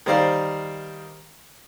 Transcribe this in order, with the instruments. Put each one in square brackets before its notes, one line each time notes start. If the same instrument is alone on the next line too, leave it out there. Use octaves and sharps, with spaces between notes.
[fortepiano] D#3 G3 C5 D5 F5